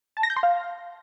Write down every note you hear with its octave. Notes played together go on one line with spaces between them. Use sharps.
A5
A#6
G6
C6
F5